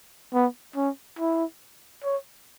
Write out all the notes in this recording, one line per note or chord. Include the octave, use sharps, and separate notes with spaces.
B3
C#4
E4
C#5